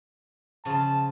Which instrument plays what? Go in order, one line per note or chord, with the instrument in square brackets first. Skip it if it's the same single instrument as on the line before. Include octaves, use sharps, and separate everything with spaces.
[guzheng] C#3 F3 F4 [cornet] A5